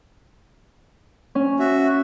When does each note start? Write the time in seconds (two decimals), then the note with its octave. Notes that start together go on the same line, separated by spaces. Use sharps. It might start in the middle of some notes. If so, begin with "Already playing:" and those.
1.35 C#4
1.59 F#4 E5